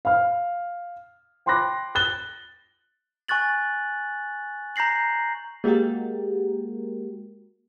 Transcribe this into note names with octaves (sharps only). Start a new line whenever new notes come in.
F5 F6
G5 B5 C6 D6 F#6 A#6
F#6 A6 G7
G#5 C#6 F#6 A6 F#7
A#5 G6 A#6 C7 F#7
G#3 A#3 F#4 G4 A#4